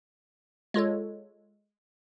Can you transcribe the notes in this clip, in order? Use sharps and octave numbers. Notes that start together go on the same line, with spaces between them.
G#3 F4 A4 C#5